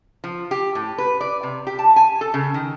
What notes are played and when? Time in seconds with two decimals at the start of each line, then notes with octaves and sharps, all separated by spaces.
0.24 F3
0.51 G4
0.75 A2
0.98 B4
1.21 D5
1.43 C3
1.67 G4
1.79 A5
1.96 G#5
2.21 A4
2.34 C#3
2.54 D#3